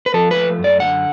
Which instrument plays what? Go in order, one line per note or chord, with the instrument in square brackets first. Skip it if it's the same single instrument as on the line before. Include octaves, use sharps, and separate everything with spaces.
[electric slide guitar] B4
F3 A4
B4
A3
F#2
D5
D3 F#5